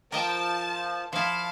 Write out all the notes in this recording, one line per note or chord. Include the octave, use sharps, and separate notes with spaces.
F3 A#4 D#5 G5 A5
F3 E4 F5 A5